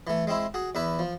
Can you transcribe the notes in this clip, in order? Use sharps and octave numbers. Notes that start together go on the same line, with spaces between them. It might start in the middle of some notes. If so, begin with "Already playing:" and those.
E3 A3
G#3 C4 E4
F#4 G#4
E2 E4 B4
F3